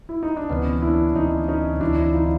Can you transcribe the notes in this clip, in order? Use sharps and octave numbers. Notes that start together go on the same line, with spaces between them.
E4
D#4
D4
D2 C3 E3 B3 C#4
D4 E4
D2 C3 E3 C#4 D#4
C#4 D#4
D2 C3 E3 D4 E4
D4 E4
D#4 F4